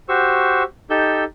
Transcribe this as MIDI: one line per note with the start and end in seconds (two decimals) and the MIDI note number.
0.09 0.63 66
0.09 0.63 67
0.09 0.63 72
0.09 0.63 85
0.09 0.63 88
0.90 1.24 63
0.90 1.24 67
0.90 1.24 69
0.90 1.24 88
0.90 1.24 91